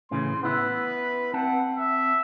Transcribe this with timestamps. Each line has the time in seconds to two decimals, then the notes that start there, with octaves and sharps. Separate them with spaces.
0.11 A2 C#3 E3 C6
0.43 B3 E4 B4 E5
1.34 C4 F#5 A5
1.76 E5